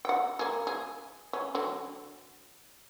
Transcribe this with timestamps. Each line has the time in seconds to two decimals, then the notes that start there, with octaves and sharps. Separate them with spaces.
0.05 F#5 G5
0.39 A#3 G#4
0.67 G#4
1.33 C#4
1.55 D3 F#3